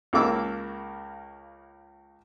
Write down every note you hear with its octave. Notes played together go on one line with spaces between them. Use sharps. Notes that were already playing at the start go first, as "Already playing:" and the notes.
C#2 C#3 A#3 D6 E6